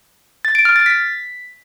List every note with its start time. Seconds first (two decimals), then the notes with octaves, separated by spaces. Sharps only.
0.45 A6
0.55 D7
0.65 F6
0.76 A6
0.86 B6